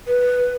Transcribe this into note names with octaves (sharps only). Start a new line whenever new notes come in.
B4